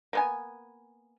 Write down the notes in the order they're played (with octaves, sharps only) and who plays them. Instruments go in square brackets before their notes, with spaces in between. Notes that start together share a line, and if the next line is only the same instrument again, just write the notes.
[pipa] A#3 B3 G#5